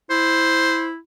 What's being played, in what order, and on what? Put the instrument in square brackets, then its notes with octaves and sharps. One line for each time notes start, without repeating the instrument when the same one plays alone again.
[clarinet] E4 [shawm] C5